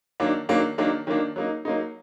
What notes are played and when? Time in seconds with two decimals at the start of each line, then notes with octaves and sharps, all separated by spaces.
0.20 D#3 F#3 A#3 D4
0.49 D#3 F#3 A#3 D4
0.78 D#3 F#3 A#3 D4
1.07 D#3 F#3 A#3 D4
1.36 F#3 A#3 D#4
1.65 F#3 A#3 D#4